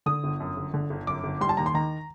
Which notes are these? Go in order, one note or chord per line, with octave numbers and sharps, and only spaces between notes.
D3 D#6
G1
F#2
G1
D3
G1
F#2 D6
G1
G3 C6
A5
D#2 A#5
C6
D#3 A#5